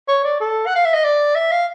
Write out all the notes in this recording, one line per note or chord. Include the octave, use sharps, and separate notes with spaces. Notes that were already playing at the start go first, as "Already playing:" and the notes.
C#5
D5
A4
F#5
F5
E5
D#5
D5
E5
F5